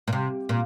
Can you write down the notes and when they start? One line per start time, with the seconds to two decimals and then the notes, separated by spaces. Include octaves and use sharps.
0.08 A#2
0.13 C3
0.49 A#2